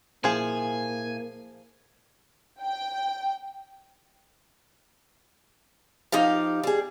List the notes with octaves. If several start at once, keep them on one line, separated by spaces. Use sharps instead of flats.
A#2 F3 A#3 E4 G#4 E5 G#5
G5
F3 D#4 G4 F5
G3 G#4